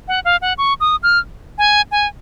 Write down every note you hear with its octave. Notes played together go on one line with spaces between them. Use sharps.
F#5
F5
F#5
C#6
D#6
F6
G#5
G#5